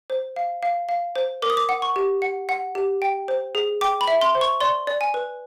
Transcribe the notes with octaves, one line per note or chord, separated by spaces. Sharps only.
C5
F5
F5
F5
C5
A#4 D6
D#6
D6
F#5
C#6
G4
F#5
F#5
G4
G5
C5
G#4
G5 D6
B5
E5
C6
C5
C#6
D5 C6
D5
G#5
B4